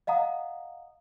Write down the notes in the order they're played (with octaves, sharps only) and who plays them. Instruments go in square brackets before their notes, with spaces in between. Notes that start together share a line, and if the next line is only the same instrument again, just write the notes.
[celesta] D#5 F5 F#5 A#5 D#6